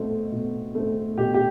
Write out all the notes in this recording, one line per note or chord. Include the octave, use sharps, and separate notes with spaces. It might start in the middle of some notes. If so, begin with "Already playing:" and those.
Already playing: B2 A3 C4
B2
A3 C4
B2 G4
G4